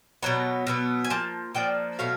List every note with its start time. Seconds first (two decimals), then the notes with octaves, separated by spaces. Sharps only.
0.23 B2 F#3 B3 A#5
0.67 B2 F#3 B3
1.04 G#5
1.10 F3 A#3 A5
1.55 F3 A#3 D4 G5
1.99 B2 F#3 A3 F5